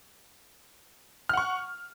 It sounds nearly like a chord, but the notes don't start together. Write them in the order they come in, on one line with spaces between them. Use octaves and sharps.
F6 F#5 C#6